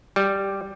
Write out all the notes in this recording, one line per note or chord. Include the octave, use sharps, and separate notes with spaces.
G3